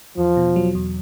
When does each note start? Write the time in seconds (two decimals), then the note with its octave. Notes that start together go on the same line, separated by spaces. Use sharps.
0.17 E2 F3
0.37 B2
0.56 F#3
0.75 E2